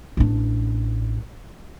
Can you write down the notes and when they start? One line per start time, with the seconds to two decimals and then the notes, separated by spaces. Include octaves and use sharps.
0.17 A1 D4